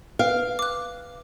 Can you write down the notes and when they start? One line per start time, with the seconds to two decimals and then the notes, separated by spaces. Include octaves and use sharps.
0.19 B4 F5 G5
0.59 D6 F#6